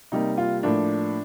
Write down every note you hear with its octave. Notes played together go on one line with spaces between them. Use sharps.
C3 G3 A#3 D#4
F4
A2 F3 A#3 D4